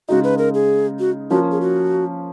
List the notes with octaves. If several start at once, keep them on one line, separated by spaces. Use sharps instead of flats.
C#3 G#3 D#4 F#4
B4
A#4
G#4
F#4
F3 A#3 C#4 F4 F#4
G#4
F#4